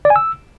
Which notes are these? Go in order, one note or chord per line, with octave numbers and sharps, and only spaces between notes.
D5
G#5
E6